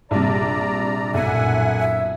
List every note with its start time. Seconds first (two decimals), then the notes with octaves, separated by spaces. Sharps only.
0.11 A#1 G2 C3 D5 A#5
1.14 B1 F#2 A#2 E5 F#5 G#5
1.79 E5